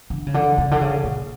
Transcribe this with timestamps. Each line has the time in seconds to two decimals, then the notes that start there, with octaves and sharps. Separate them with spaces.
0.10 D3
0.27 C#3
0.34 D3
0.58 C#3
0.71 D3
0.81 C#3
1.04 A#2